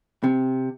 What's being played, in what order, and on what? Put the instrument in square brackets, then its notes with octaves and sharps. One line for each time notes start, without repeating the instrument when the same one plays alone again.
[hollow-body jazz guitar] C3